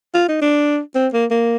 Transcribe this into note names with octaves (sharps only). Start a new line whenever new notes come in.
F4
D#4
D4
C4
A#3
A#3